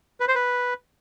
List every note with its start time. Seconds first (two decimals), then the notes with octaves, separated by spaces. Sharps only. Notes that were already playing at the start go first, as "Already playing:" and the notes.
0.20 B4
0.28 C5
0.35 B4